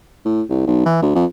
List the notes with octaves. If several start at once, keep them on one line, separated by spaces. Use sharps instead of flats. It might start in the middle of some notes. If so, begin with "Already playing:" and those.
A2
C2
B1
E3
D2
F2